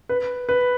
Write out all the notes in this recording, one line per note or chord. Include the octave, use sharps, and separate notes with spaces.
B4
B4